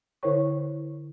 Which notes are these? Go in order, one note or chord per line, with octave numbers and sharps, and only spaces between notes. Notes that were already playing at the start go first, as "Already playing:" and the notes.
D3 E4 A#4 C5 C#5 C#6